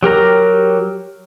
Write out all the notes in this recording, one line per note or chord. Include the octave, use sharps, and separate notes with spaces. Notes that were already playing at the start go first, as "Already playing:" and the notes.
F#3 G4 A#4 A#5